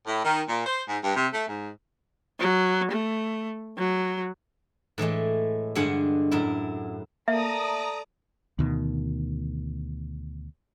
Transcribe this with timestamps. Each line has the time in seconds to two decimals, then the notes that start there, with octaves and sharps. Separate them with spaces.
0.07 A2
0.24 D#3
0.48 A#2
0.66 C5
0.88 G#2
1.04 G2
1.16 C3
1.33 A3
1.49 G#2
2.39 F#3
2.91 A3
3.77 F#3
4.98 A2 E3 G#3 A3
5.75 G2 D3 G#3 G#4 F#5 G#5
6.31 F#2 A2 E4
7.28 A3 A#3 D5 E5 A#5 D#6
8.59 D2 B2 D#3